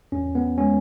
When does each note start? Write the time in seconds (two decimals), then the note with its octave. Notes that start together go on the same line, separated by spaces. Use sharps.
0.12 E2 C#4
0.35 B3
0.58 G#3 C#4